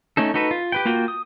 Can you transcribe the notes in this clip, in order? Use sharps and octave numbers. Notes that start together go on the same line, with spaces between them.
A3 C#4 D#4 A4
D#4 F#4 A4 B4
F4
G4 B4 G5
A#3 F4 F#4 G5
D#6